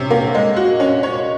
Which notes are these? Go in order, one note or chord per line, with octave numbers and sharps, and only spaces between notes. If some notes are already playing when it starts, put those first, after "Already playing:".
Already playing: C3 C#4
A#3
G#3
F#4
C#4
C#5